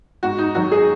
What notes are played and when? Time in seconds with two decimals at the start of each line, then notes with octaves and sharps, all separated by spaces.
0.23 G#2 F#4
0.38 D#4
0.55 D#3 F#3 F#4
0.72 G#4